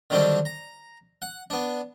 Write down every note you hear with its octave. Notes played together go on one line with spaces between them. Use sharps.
D3 D#3 F#3 G3 C4 D4
A#5
F#5
B3 D4